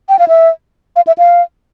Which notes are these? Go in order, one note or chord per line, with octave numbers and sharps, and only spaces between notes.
G5
F5
E5
F5
E5
F5